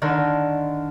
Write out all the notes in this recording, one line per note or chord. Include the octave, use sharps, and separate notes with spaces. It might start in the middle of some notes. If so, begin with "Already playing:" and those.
D3 D#3